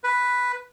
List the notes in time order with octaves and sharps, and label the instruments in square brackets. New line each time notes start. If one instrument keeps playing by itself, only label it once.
[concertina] B4